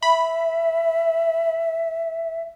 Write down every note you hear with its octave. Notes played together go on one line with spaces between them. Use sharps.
E5 B5